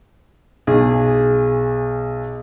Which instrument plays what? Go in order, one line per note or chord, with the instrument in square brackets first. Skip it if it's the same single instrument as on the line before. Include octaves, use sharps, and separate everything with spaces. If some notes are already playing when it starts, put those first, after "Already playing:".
[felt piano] B1 [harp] G#4